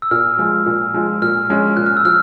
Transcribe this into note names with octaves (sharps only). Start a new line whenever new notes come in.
E6
A#2 F6
F3 G#3
A#2
F3 G#3
A#2 F6
F3 G#3 C#4
A#2 F#6
F6
E6
F3 F6